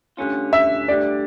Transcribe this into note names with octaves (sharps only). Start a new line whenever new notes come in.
D2 D3 G3 C#4 F4
E5
D2 D3 G3 D5